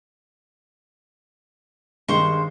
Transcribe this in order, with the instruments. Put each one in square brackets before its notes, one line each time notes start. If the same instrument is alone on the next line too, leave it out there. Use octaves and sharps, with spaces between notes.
[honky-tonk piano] G2 D#3 G#3 [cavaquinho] C5 C#6